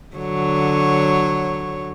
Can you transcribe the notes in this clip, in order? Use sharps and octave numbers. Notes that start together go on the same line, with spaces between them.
D3 F#3 C#5